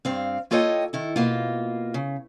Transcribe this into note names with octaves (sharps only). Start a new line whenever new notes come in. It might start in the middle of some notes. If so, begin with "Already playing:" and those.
G2 C4 F5
A#3 F4 A4 C#5 D#5 G5
D#3 E4 A4
B2 A#3 F4
C#3